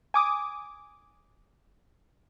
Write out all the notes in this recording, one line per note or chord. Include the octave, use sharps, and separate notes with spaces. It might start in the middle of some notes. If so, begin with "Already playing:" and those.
G#5 D6 D#6